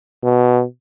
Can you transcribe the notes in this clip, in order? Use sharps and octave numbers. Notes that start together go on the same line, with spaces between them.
B2